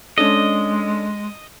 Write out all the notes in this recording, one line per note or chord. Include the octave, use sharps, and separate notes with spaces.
G#3 C#4 D4 A4 D#5